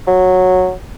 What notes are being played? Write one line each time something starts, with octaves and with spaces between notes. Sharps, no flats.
F#3